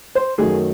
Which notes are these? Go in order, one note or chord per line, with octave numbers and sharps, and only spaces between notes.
C5
F#2 D#3 F#3 A3 G#4